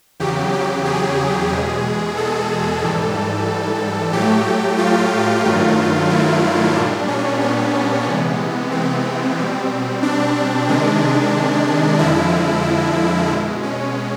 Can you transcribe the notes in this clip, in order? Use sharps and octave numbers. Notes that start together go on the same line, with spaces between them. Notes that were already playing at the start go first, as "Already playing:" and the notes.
E2 C#3 F#3 G4
G4
G#4
E2 B2 G#3
A4
G#2 E3 G3
A2 F#3 A3 G4
F4
G2 D#3 F#3 A3
E4
A#2 G3 D4
C#4
B3
C3 E3 G#3
C4
B2 G3
D4
C3 D#3 G#3
F2 D3 F3 G#3 E4
B2 G#3
C#4